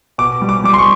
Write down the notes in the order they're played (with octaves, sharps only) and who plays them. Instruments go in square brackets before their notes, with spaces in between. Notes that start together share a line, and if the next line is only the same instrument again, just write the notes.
[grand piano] B2 D6
G3
D6
G3 D6
C6
C#6